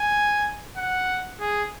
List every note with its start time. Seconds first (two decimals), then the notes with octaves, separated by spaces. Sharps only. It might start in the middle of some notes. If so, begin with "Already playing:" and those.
Already playing: G#5
0.78 F#5
1.41 G#4